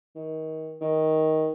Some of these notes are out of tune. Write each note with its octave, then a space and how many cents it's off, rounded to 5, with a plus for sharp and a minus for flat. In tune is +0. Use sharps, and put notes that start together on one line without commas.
D#3 +25
D#3 +10